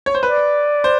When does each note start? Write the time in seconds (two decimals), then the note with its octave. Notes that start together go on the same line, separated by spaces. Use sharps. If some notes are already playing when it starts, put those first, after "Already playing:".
0.06 C#5
0.15 C5
0.23 B4 D5
0.84 C5